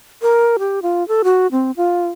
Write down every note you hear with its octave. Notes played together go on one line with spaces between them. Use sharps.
A#4
G4
F4
A4
F#4
C4
F4